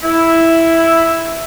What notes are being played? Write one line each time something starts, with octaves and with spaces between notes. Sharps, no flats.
E4